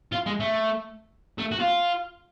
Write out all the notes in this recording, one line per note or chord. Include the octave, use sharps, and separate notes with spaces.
F4
G#3
A3
A3
F#4
F4